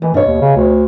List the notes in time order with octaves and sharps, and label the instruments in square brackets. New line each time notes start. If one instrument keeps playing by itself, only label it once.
[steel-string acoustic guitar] D#2 [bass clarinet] E3
[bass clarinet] G2 [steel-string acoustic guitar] B2 C#5
[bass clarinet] D#2
C#3
D2